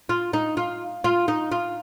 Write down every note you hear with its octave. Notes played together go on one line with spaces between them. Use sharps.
F4
D#4
F4
F4
D#4
F4